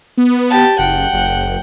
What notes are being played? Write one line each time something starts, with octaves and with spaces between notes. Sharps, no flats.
B3
G4 A5
F#1 F#5 G5
F#1